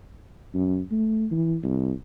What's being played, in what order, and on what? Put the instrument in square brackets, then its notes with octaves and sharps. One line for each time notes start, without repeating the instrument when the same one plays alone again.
[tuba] F#2
A3
E3
C2